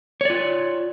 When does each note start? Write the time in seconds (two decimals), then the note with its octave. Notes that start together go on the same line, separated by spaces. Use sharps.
0.21 C#5
0.25 D5
0.30 F4